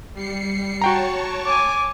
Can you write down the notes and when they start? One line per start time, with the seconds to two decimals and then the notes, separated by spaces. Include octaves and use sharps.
0.13 G3 C7 C#7
0.81 F#4 C#5 G5 A5 A#5 C#6
1.46 G#5 D6